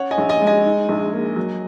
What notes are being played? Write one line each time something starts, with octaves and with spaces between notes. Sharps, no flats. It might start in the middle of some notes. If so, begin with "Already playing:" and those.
Already playing: C#4 C#5 F#5
D#5 G#5
A#1
D#5 G#5
G#3
D#5 G#5
D#4
A#1
A#3
F#3